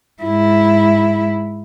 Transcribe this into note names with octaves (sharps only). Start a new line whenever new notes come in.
G#2 E4